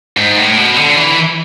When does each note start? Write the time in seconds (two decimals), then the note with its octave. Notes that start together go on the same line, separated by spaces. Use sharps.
0.17 G#2
0.37 A2
0.57 B2
0.76 D3
0.96 E3